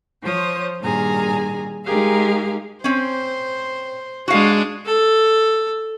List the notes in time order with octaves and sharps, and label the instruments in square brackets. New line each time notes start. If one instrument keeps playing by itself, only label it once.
[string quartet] F3 C5 C#5 D#6
G2 A#2 D#3 G#4 G#5 A#5
G#3 D#4 G4 G#4 A#4 F5
[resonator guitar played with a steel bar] C4 C#4 [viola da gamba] C5
[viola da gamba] G#3 D4 G#4 [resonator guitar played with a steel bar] F#4 F5
[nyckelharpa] A4